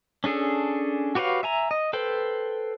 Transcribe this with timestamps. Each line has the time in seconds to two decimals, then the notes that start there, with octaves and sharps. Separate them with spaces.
0.24 C#4 D4 G#4 A4
1.15 F#4 G4 B4 C#5 F5
1.43 E5 G#5 A#5
1.71 D#5
1.93 A4 B4 C5 G5